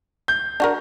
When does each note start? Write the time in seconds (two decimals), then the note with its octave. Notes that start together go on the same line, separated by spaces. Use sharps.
0.28 G6
0.60 D4 F#4 A#4